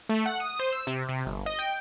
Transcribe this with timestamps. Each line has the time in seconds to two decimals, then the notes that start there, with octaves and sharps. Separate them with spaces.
0.09 A3
0.26 F#5
0.40 D#6
0.59 C5
0.73 E6
0.87 C3
1.09 C3
1.26 G1
1.46 D#5
1.59 G5